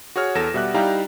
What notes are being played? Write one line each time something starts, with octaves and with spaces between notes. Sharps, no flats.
F#4 G#4 C#5 F6
E2 A4 A#6 E7
B2 G3 E5 F#5 D6 F#6
G3 D#4 E4 F5 G5 A#5